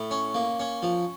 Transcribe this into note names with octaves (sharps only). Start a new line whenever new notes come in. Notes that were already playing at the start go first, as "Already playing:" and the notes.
Already playing: A2
C#4
A#3
C#4
F3